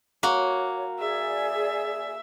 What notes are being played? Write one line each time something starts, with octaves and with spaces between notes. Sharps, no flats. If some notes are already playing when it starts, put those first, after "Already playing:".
A#3 F#4 C#5
G#4 D5 E5